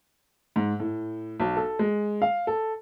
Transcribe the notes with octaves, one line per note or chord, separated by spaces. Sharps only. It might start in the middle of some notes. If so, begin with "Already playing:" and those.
G#2
A2
B1
A4
G#3
F5
A4